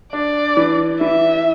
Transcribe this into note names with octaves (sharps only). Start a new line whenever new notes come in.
D4 D5
E3
E3 E5